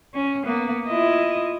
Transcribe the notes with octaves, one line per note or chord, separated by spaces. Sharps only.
C#4
A#3 B3
E4 F4 D#5